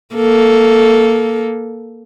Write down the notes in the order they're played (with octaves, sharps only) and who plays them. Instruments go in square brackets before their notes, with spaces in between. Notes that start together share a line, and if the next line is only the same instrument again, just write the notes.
[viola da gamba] A#3 A4